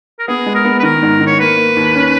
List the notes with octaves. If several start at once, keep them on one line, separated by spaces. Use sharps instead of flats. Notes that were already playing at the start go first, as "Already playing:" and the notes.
A#4
B3 G#4
G#3
A#4
B3
B4
D#3 A#4
G#2
D#3
C#5
A#3 B4
A#3
D#2
C#4